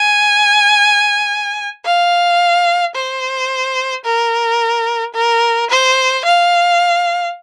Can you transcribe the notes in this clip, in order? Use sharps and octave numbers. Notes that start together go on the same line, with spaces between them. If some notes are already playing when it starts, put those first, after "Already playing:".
Already playing: G#5
F5
C5
A#4
A#4
C5
F5